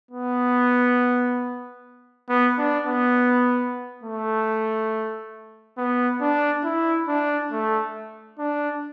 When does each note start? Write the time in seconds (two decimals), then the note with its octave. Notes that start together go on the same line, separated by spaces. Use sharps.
0.11 B3
2.29 B3
2.58 D4
2.87 B3
4.03 A3
5.78 B3
6.21 D4
6.64 E4
7.08 D4
7.52 A3
8.39 D4